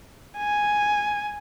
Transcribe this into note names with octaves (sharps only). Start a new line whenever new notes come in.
G#5